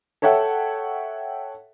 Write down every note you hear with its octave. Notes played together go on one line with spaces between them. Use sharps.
A4 C#5 E5 F#5 G5